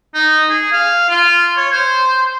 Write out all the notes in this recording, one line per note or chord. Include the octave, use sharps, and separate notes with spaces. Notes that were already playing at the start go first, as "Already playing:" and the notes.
D#4
G#4
F5
F4
C#5
C5